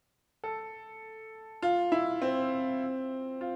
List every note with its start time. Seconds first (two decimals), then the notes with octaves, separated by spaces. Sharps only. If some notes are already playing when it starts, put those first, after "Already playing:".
0.44 A4
1.62 F4
1.92 E4
2.22 C4
3.41 F4